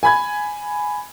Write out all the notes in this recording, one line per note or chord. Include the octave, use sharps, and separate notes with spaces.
G#5 B5 G#6